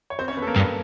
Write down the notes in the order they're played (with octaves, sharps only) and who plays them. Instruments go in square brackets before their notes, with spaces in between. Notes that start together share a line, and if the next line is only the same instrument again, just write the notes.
[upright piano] C#5
C4 C5
C#4 C#5
B3 B4
A4
A#3 A#4
[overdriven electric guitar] G2